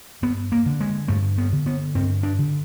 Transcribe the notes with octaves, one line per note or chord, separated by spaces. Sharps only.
G2 B3
A#3
D3
G#3
G2 A3
B3
D3
B3
G2 C4
D4
D3